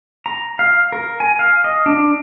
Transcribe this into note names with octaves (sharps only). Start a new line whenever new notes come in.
A#5
F5
A#4
G#5
F5
D#5
D4